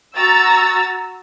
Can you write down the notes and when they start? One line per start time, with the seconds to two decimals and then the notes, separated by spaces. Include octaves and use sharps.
0.15 F#4 A#5 E6 A6